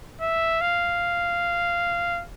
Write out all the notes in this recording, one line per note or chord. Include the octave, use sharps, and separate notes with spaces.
E5
F5